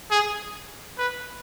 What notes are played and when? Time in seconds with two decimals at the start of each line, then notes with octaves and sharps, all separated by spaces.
0.11 G#4
0.98 B4